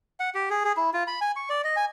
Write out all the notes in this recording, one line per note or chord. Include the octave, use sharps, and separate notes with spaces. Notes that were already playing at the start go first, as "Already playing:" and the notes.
F#5
G4
G#4
G#4
E4
F4
B5
G#5
C#6
D5
D#5
G#5